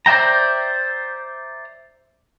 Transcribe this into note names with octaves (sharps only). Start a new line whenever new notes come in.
C5 D5 E5 G5 A#5